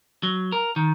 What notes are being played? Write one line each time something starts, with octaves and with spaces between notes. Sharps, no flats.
F#3
A#4
D#3